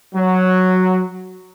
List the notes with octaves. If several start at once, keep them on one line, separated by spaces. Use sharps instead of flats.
F#3